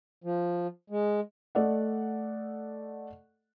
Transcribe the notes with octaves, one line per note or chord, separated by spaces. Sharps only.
F3
G#3
A3 A4 D5 D#5 F#5